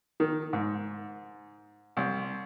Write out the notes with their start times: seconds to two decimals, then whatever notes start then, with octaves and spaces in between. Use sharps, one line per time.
0.20 D#3
0.53 G#2
1.97 C2